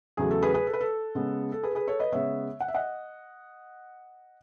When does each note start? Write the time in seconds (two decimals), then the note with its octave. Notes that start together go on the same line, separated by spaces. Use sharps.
0.17 E2 C#3 F#3 A3 G#4
0.31 A4
0.42 G#4 B4
0.54 G#4 B4
0.67 A4
0.73 B4
0.80 A4
1.15 C#3 G#3 B3
1.52 A4
1.63 G#4 B4
1.71 A4
1.75 G#4 B4
1.87 A4 C#5
2.00 B4 D#5
2.12 C#3 G#3 B3 C#5 E5
2.60 F#5
2.68 E5
2.74 D#5 F#5